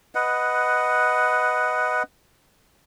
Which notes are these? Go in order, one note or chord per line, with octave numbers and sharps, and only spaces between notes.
B4 D#5 F#5